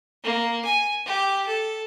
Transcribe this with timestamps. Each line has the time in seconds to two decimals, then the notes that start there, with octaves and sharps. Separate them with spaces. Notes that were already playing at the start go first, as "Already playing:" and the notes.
0.23 A#3
0.64 G#5
1.06 G4
1.47 A4